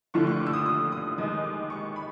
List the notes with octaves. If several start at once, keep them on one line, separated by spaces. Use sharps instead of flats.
D#2 D3 F3 A3 C#6
C#6
D6
E6
D#6
D#6
D#6
D#2 D#3 G#3 D#6
D6
C#6
B5